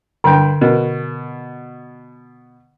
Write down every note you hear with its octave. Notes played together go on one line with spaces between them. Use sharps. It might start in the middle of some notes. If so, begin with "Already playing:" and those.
G2 D3 G5 C6
B2 A#4